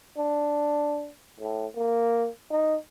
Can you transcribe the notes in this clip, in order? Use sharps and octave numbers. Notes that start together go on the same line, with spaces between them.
D4
A2
A#3
D#4